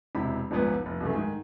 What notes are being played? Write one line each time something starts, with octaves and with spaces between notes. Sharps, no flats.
E1 C3 E4 B5
D#1 A#1 G#2 B3
F1
C2 F#2 C#3 E3 A3
G#2 D#3